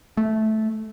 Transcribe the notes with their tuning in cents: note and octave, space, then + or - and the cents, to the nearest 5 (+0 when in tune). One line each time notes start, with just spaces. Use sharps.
A3 -10